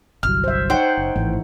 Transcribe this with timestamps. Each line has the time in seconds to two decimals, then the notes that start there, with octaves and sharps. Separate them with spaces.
0.23 G1 C2 F#3 F6
0.44 C5 E5
0.70 D#4 C5 C#5 F#5 G5
0.97 F#1
1.16 G#1 A2 E3 A3